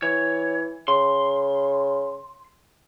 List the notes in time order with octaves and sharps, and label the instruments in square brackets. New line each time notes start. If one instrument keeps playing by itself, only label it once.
[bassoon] E3 [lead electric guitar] C#5
[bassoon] C#3 [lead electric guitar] C6